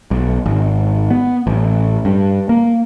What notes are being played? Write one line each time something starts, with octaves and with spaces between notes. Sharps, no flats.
B1
G#1
B3
A1
G2
A#3